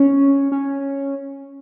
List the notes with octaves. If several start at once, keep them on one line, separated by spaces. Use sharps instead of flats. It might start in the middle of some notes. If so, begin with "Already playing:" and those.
Already playing: C#4
C#4